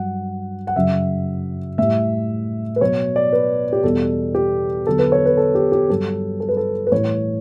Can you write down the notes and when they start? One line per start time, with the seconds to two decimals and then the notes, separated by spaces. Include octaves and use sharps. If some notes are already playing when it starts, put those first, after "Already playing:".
Already playing: G2 F#3 F#5
0.67 F#5
0.76 F#2 C#3 F#3 E5
1.78 A2 G3 E5
2.76 B4
2.81 B2 F#3 C#5
3.16 D5
3.33 B4
3.73 G4
3.84 E2 B2 G3 A4
4.35 G4
4.87 E2 D3 F#3 A4
4.99 B4
5.12 C#5
5.25 B4
5.37 A4
5.55 G4
5.72 G4
5.90 G2 F#3 A4
6.40 A4
6.49 B4
6.57 A4
6.87 B4
6.92 A2 E3 G3 C#5